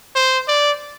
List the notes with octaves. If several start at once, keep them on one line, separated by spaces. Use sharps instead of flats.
C5
D5